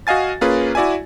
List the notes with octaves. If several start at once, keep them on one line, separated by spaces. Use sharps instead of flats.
F#4 D#5 F5 G#5 A6
A#3 C#4 F4 G#4 B4
E4 F#4 D5 E5 G#5